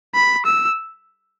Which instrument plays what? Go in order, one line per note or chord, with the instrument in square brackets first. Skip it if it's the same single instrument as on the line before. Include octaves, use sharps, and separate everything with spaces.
[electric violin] B5
E6